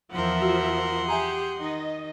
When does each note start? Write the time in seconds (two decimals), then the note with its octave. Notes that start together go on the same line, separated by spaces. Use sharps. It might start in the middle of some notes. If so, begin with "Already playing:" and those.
0.12 E2 F3 A#4 E5 F#5 C6
0.42 F#4
1.09 G4 G#4 E5 G#5 A#5
1.57 D#3 D#4 D#5